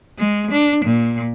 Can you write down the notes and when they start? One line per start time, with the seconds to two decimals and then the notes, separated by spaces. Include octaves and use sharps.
0.19 G#3
0.52 D4
0.85 A#2